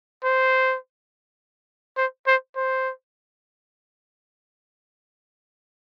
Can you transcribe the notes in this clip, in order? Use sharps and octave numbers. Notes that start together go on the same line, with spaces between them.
C5
C5
C5
C5